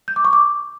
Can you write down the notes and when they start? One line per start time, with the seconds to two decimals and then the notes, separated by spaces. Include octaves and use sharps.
0.08 G6
0.16 D6
0.25 C#6
0.33 D6